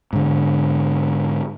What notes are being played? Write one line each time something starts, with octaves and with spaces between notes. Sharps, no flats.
G#2 D3